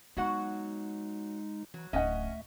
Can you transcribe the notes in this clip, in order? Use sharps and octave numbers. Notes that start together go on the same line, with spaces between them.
F#3 G#3 B3 D#4 F#4 F#5
E3 F#3
D1 A3 C#4 D#5 E5 F#5